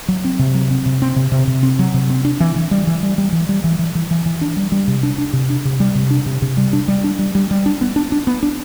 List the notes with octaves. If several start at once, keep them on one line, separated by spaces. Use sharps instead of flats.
F#3
C4
C3
F#3
C4
C3
C4
C3
C3
C3
C4
F#3
C3
C4
D4
E3
E3
G3
E3
G3
G3
E3
G3
E3
E3
E3
E3
E3
D4
G3
G3
C3
D4
D4
C3
D4
C3
G3
C3
D4
C3
C3
G3
D4
G3
D4
G3
G3
G3
D4
B3
D4
D4
B3
D4